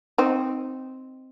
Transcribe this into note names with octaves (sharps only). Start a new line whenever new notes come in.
C4 D#4